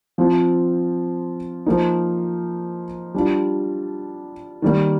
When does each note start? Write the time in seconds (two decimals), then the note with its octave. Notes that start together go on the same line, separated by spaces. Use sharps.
0.18 F3 C4 F4
1.66 F3 A#3 D#4
3.14 G3 D4 F4
4.62 D#3 G3 A#3